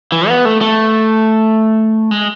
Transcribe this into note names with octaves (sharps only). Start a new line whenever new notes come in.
E3
B3
A3
A3
G#3